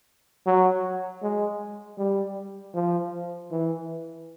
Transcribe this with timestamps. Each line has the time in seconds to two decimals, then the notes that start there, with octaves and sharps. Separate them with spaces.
0.46 F#3
1.23 G#3
1.98 G3
2.74 F3
3.51 E3